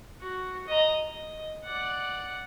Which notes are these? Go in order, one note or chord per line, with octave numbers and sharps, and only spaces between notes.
F#4
D#5 A#5
D#5
D5 F#5